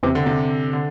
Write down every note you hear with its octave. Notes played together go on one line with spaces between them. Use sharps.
E2 C3 E3 C4 G4
D3
C3
D3